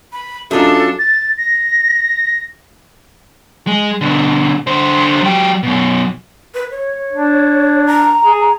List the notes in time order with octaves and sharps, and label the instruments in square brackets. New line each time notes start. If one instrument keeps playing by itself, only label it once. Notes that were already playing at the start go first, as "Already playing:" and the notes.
[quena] B5
[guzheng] F#2 D#5 [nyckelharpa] D4 [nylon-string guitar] F4 E5 [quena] A4
[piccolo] A6
A#6
[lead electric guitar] G#3
B2 D3
D3 C5
F#3 G4
F#2 B2
[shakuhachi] B4
C#5
[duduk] D4
[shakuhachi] A#5
[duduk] G#4